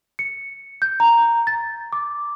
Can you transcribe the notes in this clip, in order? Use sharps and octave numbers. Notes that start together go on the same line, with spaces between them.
C#7
G6
A#5
A6
D6